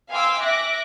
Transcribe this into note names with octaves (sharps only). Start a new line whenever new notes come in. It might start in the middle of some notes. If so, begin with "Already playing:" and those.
F5 G5 G#5 C6 D6 E6
E5 D6 F#6 A#6